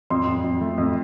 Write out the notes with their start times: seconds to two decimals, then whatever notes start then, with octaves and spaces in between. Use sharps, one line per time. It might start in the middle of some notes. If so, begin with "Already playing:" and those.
0.10 F2 C6
0.27 F2
0.44 F2
0.61 A3
0.78 F2